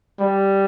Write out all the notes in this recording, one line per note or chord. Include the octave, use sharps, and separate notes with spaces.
G3